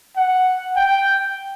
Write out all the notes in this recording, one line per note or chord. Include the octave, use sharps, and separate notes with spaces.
F#5
G5